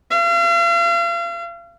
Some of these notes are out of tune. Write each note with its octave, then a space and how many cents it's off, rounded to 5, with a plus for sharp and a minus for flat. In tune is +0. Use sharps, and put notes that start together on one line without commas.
F5 -40